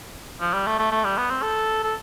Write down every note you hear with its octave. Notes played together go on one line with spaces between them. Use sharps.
F3
G3
A3
A3
A3
G3
B3
C4
A4
A4